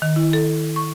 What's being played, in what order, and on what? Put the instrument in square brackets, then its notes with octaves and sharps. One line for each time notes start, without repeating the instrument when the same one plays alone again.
[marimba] D#3
E4
A4
C#6